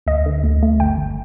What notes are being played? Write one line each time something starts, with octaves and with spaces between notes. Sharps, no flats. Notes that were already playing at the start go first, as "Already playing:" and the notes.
D2 D#5
D3
D2
A3
G1 G5
G1